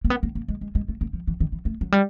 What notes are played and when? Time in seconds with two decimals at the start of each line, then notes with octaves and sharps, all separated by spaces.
0.04 A#3
0.10 B3
0.23 A#3
0.35 A#3
0.48 G#3
0.61 G#3
0.75 G#3
0.89 A3
1.01 A#3
1.13 F3
1.27 E3
1.40 D#3
1.52 E3
1.65 A3
1.81 F#3
1.92 G3